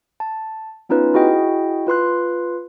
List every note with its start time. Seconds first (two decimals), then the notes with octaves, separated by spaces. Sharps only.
0.20 A5
0.89 B3 C#4 D#4 F4 B4
1.14 E4 F#4 G#4 D#5 G5
1.87 F4 B4 C6 F#6